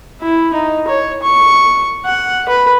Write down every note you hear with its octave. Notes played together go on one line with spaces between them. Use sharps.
E4
D#4
C#5
C#6
F#5
B4